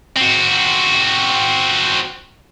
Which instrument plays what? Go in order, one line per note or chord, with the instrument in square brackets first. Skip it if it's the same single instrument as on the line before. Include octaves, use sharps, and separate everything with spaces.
[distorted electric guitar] C4 F#4